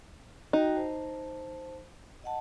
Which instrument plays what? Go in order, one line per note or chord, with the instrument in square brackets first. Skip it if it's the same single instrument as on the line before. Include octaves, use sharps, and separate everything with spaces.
[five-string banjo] D#4 [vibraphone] F#4 G5
[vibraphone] C5 A5
D#5 F#5 A5